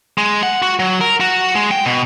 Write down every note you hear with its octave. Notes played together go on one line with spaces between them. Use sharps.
G#3
F#5
F#4
F#3
A#4
F#4
G#3
G5
B2